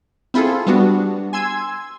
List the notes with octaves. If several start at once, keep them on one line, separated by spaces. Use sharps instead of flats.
C4 E4 F4 G#4 A4
G3 B3 D4 F#4
G#5 C6 E6 G#6